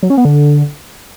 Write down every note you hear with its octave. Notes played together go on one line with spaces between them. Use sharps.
F#3
C#4
B3
D3